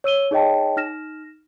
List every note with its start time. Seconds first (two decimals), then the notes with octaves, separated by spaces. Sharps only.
0.04 C#5 E6 D#7 G7
0.31 D#4 G#4 C#5 D#5 G5 A5
0.76 D#4 F6 A#6 E7